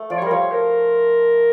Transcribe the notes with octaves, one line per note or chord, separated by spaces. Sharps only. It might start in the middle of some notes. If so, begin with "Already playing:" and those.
Already playing: A3
F3 D5
C#5
G3 A#4
F3 C#5
A#4